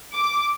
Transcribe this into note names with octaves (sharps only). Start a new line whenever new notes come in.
D6